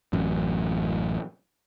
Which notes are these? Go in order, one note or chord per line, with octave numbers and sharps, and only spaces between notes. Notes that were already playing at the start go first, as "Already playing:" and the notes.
A1 F#2